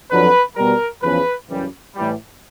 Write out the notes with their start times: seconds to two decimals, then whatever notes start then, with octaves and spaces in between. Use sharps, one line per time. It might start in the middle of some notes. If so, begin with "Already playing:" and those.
0.11 F2 D3 F#3 B4
0.56 B2 G3 A#4
1.03 E2 C#3 F3 B4
1.49 F#2 C#3 E3 G3
1.95 A2 E3 G3